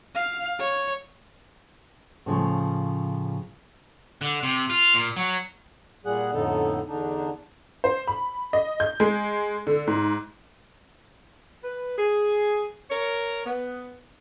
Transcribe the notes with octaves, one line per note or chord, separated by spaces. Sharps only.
F5
C#5
A2 C#3 F3
D3
C3
F4
A#2
F#3
A#2 G3 G#4 F#5
F2 A2 D3 B3 D#4 A4
E2 D3 D4 D#4
C5
B5
D#5
G6
G#3
D3
G#2
B4
G#4
A#4 C#5
B3